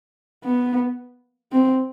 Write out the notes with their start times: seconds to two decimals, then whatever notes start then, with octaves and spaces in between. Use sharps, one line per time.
0.44 B3
1.52 C4